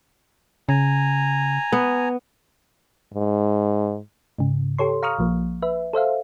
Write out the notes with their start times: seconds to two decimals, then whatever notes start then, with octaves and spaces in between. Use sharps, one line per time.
0.69 C#3 G#5 A#5
1.73 B3
3.14 G#2
4.38 G#2 C#3
4.78 G4 A4 C#5 C6
5.03 F5 A#5 C#6 D#6 F6
5.19 A#1 F3 A#3
5.62 B4 E5
5.93 A4 C5 E5 F5